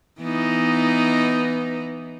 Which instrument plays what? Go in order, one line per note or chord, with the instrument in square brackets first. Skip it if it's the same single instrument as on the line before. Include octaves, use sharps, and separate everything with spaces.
[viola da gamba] E3 B3 D#4